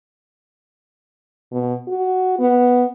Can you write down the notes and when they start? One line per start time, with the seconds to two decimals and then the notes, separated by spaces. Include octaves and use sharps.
1.52 B2
1.88 F#4
2.39 B3